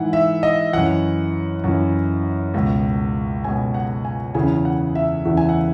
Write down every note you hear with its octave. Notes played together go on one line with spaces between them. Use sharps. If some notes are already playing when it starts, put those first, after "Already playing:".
Already playing: G#2 E3 F#5
E5
D#5
F#2 E3 F#5
F#2 E3
C#2 B2
C#2 B2 G#5
F#5
G#5
E2 C#3 E3 G#5
F#5
E5
E2 C#3 E3
G#5
F#5